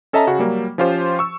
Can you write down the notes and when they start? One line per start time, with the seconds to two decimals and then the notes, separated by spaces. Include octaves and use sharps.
0.13 C#4 A4 D#5 E5 A5 A#5
0.27 C#3 F#4
0.38 F#3 G3 A#3
0.78 F3 C#4 F4 G4 C5
1.19 C#6 E6